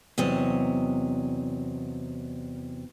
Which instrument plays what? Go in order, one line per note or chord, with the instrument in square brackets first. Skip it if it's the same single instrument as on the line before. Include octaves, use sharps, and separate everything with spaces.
[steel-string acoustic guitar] E2 C3 F#3 D#5